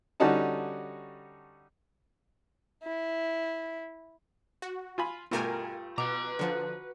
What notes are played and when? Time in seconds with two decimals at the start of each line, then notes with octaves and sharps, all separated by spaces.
0.20 D3 G3 C#4 D#4 F#4 A5
2.84 E4
4.62 F#4
4.98 F4 G#5 B5
5.31 G2 B2 A3 F4 G4 A#4 G#5
5.98 B2 B4 A#5 D6
6.39 D3 F3 F#4